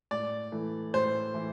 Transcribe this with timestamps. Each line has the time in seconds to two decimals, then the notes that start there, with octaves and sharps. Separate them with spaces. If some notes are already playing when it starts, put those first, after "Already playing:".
0.11 A2 D5
0.52 E3 A3 E4
0.94 A2 C5
1.34 E3 A3 E4